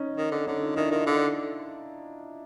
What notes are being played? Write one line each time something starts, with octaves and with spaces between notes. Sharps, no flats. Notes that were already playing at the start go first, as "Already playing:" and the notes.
Already playing: C#4 D#4
D#3
D3
D3 C#4 D#4
D#4 F4
D#3 D4 E4
D#3 D#4 F4
D3